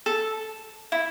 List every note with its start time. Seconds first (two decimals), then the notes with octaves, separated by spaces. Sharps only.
0.06 A4
0.92 E4